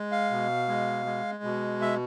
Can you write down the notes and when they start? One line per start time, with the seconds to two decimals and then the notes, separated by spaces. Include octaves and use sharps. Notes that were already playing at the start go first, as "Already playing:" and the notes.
Already playing: G#3
0.12 F5
0.31 B2
0.68 G#3
1.06 G#3
1.43 B2
1.81 E5